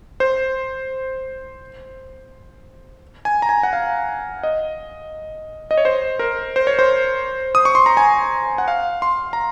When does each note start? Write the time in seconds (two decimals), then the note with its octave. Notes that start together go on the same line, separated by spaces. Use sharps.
0.20 C5
3.25 G#5
3.42 A#5
3.49 G#5
3.63 F#5
3.73 F5
4.43 D#5
5.71 D#5
5.77 C#5
5.85 C5
6.19 A#4
6.56 C5
6.67 C#5
6.79 C5
7.55 D#6
7.65 C#6
7.75 C6
7.86 A#5
7.97 G#5
8.58 F#5
8.68 F5
9.02 C6
9.33 A#5